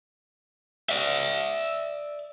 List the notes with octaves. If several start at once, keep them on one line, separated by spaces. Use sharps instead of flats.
D5 E5